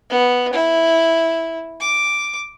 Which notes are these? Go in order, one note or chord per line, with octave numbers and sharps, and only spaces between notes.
B3
E4
D6